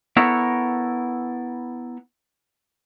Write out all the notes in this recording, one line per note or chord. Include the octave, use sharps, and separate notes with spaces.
B3 E4 A4 A#4 C#5